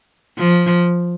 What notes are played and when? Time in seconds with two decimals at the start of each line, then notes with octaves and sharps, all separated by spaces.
0.38 F3